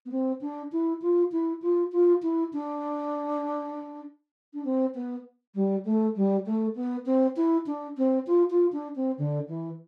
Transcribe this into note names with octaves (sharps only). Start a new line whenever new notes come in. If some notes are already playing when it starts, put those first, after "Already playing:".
B3
C4
D4
E4
F4
E4
F4
F4
E4
D4
D4
C4
B3
G3
A3
G3
A3
B3
C4
E4
D4
C4
F4
F4
D4
C4
D3
E3